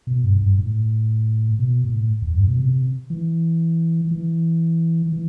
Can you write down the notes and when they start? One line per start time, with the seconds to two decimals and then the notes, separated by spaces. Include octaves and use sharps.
0.07 B2
0.24 G2
0.41 G2
0.58 A2
1.59 B2
1.84 A2
2.22 E2
2.34 G2
2.47 B2
2.60 C3
3.10 E3
4.11 E3
5.12 E3